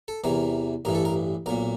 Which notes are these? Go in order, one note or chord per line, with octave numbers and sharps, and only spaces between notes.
A4
E2 C3 E3 A#4
A1 G2 E3 A#4
A4
A#4
B1 A#2 A#4